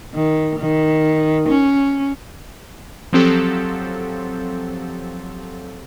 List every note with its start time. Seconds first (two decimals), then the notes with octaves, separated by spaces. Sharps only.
0.14 D#3
0.58 D#3
1.48 C#4
3.13 F3 F#3 C4 G4 A4